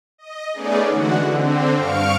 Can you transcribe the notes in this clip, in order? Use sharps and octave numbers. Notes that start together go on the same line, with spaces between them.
D#5
A3 B3 C#4 D#4 G#4 D5
D3 E3 G#3 F#4 F#5
D3 C4
G2 F5 C#6 F6 D7